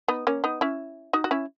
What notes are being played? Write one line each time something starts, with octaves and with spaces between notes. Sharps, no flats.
B3 D#4
A#3 C#4
B3 D#4
C#4 E4
D#4 F#4
F#4
C#4 E4